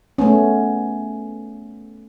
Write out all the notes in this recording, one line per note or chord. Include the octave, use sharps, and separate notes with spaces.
A3 B3 C#4